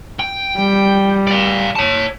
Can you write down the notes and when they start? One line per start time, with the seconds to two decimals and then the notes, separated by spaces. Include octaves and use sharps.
0.19 G5
0.58 G3
1.27 D5 F5
1.76 C#5 A5